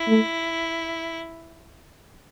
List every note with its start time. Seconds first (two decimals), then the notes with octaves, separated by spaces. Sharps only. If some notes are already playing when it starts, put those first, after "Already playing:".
Already playing: E4
0.08 A3